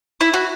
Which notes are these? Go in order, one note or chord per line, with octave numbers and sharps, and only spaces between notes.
E4
F#4